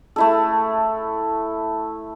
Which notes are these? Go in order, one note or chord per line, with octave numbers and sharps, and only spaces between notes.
A3 E4 A4